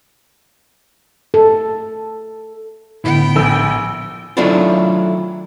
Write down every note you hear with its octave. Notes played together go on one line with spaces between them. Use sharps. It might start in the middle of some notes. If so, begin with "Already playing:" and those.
A4
A2 D3 B3 E4 G5
A#1 G#5 E6
D#3 F#3 A3 D4 E4 F4